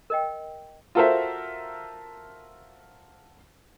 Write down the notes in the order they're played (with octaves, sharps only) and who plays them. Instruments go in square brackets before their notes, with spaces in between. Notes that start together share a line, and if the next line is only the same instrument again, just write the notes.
[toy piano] A#4 D#5 G5
[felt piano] F4 F#4 A4 A#4 C5 E5